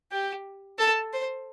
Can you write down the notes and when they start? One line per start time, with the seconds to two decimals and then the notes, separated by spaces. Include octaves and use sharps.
0.12 G4 G5
0.79 A4 A5
1.13 C5